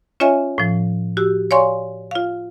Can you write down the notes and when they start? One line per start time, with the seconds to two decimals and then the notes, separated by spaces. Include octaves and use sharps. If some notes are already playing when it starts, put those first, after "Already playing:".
0.20 C#4 F4 C#5 D#5 E5 G#5
0.58 A2 F3
1.17 F#4 G4 E6
1.51 C#5 D5 F5 G#5 C6 C#6
2.11 F4 F5